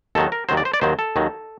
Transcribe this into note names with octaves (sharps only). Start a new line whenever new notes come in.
D#2 D#3 F#3 A4
A#4
D#2 D#3 F#3 C5
D5
C5
D5
D#2 D#3 F#3 C5
A4
D#2 D#3 F#3